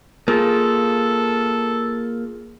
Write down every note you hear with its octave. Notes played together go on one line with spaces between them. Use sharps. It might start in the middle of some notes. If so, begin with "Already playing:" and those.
A#3 F4 G#4 A4